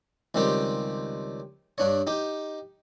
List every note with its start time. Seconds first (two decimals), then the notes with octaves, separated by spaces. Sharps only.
0.35 C#2 D#3 G3 C4 G4
1.78 G2 D4 C#5
2.07 D#4 G4